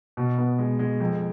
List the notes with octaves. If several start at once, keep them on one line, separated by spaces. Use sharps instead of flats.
B2
B3
G#3
G#3
F2